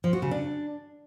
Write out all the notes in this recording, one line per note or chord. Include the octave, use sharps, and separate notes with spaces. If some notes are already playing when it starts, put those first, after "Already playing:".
F3
F#4
C#3
D4